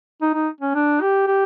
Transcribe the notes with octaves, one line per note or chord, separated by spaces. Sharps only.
D#4
D#4
C#4
D4
G4
G4